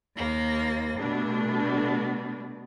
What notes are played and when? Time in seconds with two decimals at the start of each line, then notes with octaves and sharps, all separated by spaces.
0.17 D#2 A#3 A#6
0.98 B2 G3 A3 D4